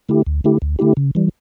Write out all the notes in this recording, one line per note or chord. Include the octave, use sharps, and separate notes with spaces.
D3 A3 E4 G4
D2
D3 A3 E4 G4
D2
D3 A3 E4 G4
C#3
E3 G3